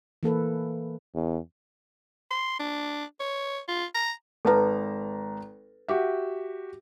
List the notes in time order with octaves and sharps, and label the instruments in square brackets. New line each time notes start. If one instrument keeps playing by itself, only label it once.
[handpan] E3 A#3 A4 B4
[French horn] E2
[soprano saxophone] C6
D4
C#5
F4
A#5
[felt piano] G#1 A5 A#5 [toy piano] A4 B4
[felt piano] F#4 G4 E5